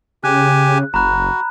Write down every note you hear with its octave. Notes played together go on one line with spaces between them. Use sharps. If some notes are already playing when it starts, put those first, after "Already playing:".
C#3 G4 G#5 F#6
F#1 F#4 A#5 B5 F#6